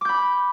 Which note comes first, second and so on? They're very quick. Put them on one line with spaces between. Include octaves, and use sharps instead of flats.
D6 G6 B5